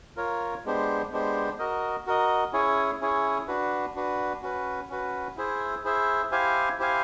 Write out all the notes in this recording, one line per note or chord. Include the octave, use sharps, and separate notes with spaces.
F4 A#4 C#5
G#3 B3 D4 G4 C5
G#3 B3 D4 G4 C5
F#4 A#4 D#5
F#4 A#4 D#5
C#4 E4 G#4 C#5
C#4 E4 G#4 C#5
D4 F#4 B4
D4 F#4 B4
C#4 F#4 B4
C#4 F#4 B4
E4 G#4 C5 E5
E4 G#4 C5 E5
E4 G4 C5 F5 G#5
E4 G4 C5 F5 G#5